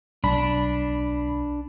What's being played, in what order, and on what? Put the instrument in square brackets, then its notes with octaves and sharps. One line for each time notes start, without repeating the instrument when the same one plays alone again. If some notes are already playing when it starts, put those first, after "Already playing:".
[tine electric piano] B1 B5 [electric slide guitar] D4